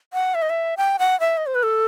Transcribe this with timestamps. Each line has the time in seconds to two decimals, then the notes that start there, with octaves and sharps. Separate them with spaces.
0.13 F#5
0.35 E5
0.42 D#5
0.50 E5
0.77 G5
0.99 F#5
1.20 E5
1.37 D#5
1.47 C5
1.55 B4
1.63 A4